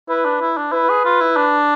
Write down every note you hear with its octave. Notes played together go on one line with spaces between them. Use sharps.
E4 B4
D4
E4
D4
E4 B4
G#4
F4
E4
D4